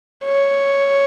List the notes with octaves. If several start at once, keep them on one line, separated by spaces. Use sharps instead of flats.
C#5